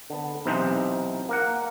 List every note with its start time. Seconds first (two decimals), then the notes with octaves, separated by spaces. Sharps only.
0.10 D3 B3
0.45 B1 C3 E3 D#4 C5
1.29 A#3 A#4 F#5